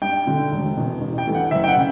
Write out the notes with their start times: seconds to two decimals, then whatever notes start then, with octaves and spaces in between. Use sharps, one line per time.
0.02 G2 G5
0.27 D3 A3
0.52 E1
0.76 E2 B2
1.01 A1
1.18 G5
1.27 G2 E3 A3
1.35 F#5
1.51 F#1 E5
1.64 G5
1.68 F#5
1.76 C#3